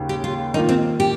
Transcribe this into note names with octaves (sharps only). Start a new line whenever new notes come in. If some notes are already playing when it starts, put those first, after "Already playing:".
Already playing: D#2 C#3
G4
F4
D#3 A#3 D#4 F4
C4
G4